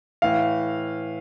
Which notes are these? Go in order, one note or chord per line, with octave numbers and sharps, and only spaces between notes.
A2 E3 F5